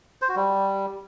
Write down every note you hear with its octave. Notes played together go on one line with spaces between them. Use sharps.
C5
F#4
G3